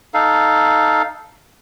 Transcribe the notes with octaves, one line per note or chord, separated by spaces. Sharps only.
D#4 A4 F5